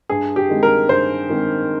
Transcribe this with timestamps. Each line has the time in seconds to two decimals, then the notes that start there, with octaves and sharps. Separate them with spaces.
0.10 G2 G#4
0.36 G4
0.49 D#3 G#3 C4
0.63 A#4
0.89 G2 C5
1.30 D#3 G#3 C4